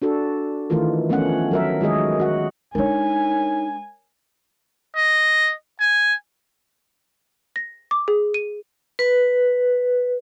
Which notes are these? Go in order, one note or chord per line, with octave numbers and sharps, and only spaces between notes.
D4 F#4 A4
D#3 E3 A3 F4 A#4
F3 A3 B3 C#4 F#5
F#3 A#4 E5
D#3 G#3 F#4 G#4 D#5
F#4 F#5
G#3 D4 D#4 A#4 C#5 G#5
D#5
G#5
A#6
D6
G#4
D#7
B4